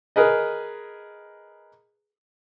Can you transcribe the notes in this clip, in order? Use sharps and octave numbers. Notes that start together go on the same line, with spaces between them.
G#4 A#4 B4 D#5